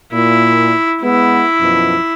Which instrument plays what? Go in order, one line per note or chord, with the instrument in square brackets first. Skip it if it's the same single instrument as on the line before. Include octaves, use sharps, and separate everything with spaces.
[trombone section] A#2 [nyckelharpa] E4
[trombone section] G#3 B3 [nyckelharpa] E4
[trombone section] F#2 B2 F3